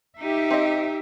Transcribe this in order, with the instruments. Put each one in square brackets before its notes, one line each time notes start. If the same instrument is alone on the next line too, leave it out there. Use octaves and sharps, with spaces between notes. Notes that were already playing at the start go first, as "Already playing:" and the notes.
[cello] D#4 [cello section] G4 E5
[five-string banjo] C4 D#5